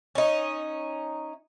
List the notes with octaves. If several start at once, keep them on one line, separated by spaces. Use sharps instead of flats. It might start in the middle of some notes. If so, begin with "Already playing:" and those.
C#4 D#4